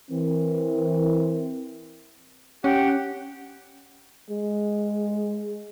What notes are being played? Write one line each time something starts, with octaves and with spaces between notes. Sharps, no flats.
E3 C4 A#4
C#4 G4 F#5
G#3